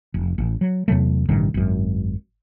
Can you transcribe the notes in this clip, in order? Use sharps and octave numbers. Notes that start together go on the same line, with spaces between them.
F1
A1
F#3
E2 C3 F#3 A3
A1 G2 C3 D#3
G#1 F#2